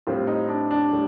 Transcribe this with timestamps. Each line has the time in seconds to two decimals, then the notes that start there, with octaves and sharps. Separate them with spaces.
0.07 A2 G3 C4 F4
0.27 D#4
0.49 D4
0.71 D4
0.92 A2 G3